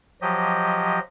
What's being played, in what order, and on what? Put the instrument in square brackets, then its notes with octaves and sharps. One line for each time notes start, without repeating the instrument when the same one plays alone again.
[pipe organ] F3 F#3 G4 D#5